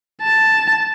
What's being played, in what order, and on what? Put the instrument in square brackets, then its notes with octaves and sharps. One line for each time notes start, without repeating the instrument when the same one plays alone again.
[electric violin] A5